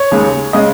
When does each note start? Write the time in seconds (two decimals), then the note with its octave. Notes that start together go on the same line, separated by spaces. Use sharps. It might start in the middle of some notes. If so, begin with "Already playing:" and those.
Already playing: C#5
0.12 D#2 C#3 G#3
0.53 C#3 G#3 D#5